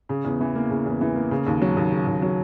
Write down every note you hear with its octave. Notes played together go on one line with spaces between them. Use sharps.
C#3
E2
E3
A#3
C#3
E2
E3
A#3
C#3
D#2
F#3
D#2
C#3
D#2
F#3